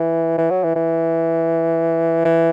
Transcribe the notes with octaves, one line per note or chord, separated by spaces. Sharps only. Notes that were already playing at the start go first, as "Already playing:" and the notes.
Already playing: E3
E3
F#3
E3
E3
E3